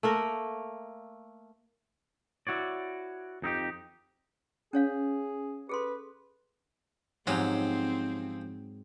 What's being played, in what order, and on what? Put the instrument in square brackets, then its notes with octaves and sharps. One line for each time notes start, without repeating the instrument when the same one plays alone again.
[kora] A3 A#3 A#4
[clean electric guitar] E4 F#4 C#5 D5
F2 D#4 E4 G4
[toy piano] C#4 C#5 F5 [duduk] G#4
[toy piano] G#4 A4 C6 [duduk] B4
[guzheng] G#2 F#3 [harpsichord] F3 C#4 G4 [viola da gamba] C4